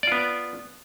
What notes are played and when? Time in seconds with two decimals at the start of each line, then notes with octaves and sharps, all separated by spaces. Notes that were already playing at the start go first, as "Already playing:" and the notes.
0.03 D5
0.07 F4
0.12 B3